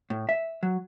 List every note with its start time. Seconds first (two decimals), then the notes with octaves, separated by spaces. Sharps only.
0.10 A2
0.29 E5
0.63 F#3